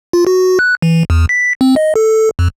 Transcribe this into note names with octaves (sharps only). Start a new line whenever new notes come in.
F4
F#4
F#6
E3
E2
B6
C4
D#5
A4
F2